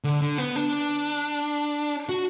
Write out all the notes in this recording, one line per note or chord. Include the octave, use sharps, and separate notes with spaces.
D3
D3
B3
D4
F#4